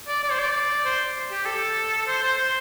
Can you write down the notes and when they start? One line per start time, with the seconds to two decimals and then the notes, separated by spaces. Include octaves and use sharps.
0.08 D5
0.23 D5
0.31 C5
0.39 D5
0.85 C5
1.31 G4
1.46 A4
2.08 C5
2.23 C5
2.38 C5